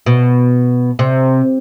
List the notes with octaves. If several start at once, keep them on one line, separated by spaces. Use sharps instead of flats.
B2
C3